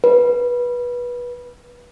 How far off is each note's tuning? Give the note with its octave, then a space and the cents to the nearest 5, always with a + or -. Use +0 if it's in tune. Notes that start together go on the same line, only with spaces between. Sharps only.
B4 -20